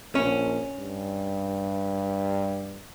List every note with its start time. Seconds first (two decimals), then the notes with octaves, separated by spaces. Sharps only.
0.15 A#1 C#4
0.79 G2